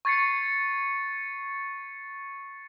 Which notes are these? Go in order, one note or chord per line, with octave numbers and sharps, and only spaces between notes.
C#6 G#6 A6 C7 C#7